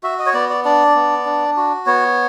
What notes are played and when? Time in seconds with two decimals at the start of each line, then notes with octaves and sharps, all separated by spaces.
0.03 F#4 E5
0.19 D#5
0.26 C#5
0.34 B3 D5
0.50 D5
0.65 D4 D5
0.95 B3
1.26 D4
1.57 F#4
1.86 B3 C#5